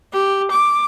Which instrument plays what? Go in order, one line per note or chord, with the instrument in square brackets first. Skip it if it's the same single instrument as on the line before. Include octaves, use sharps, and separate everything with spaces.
[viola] G4
D6